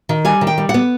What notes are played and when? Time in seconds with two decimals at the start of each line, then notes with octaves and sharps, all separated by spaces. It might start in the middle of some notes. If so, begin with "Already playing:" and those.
0.09 D#3
0.25 G3 G#5
0.41 D#3
0.47 G5
0.58 G3
0.69 F#5
0.74 B3